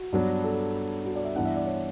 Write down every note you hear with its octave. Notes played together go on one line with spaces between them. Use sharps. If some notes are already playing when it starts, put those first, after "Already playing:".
Already playing: F#4
G2 F#3 B3 D4
A4
F#4
D5
E5
G2 E3 B3 D4 F#5
E5
D5
C#5